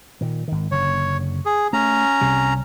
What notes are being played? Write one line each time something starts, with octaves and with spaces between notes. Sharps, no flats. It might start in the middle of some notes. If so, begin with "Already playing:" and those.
A#2 D#3
G#1 D#3
F#1 D3 C#5
G#4
A3 C#4 A#5
C2 C3 G3